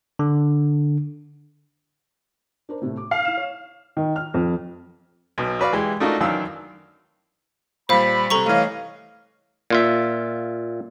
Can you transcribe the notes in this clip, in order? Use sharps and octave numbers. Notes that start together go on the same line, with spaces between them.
D3
D4 A#4 C5
A2 C3 A3
D6
F5
E4 E7
C#5
D#3
F6
F2
B1 B2
F#4 B4 D5 F5
E3 G#3 G4
A3 D4 D#4 F4 F#4 A#4
F#2 D#3 E3 D4 F5 E6
A#2 G3 C5 F5 B5
C3 G3 A4 A#5 C#6
E3 A3 C#5 D#5 F5
A#2 F4 E5